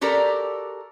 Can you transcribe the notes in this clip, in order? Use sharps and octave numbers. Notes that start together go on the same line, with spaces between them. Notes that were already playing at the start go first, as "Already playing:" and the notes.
F#4 G4 A4 A#4 D5 A#5